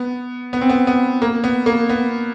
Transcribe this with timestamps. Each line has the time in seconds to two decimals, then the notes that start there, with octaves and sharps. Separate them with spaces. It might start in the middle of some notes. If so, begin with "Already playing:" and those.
Already playing: B3
0.53 B3
0.61 C4
0.70 B3
0.87 B3
1.22 A#3
1.44 B3
1.66 A#3
1.90 B3